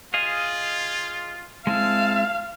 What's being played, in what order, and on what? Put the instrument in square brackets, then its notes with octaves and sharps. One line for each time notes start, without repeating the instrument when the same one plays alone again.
[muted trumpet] F4 [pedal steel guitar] G#4 D#5 F5
[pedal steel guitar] G#3 C4 E4 [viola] F5 [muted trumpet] A5